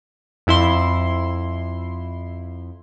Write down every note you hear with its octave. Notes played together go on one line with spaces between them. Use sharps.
F2 E4 C6